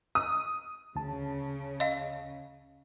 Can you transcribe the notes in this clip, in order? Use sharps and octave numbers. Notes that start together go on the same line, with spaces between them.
D#6
D2 C#3 A5
D#5 F5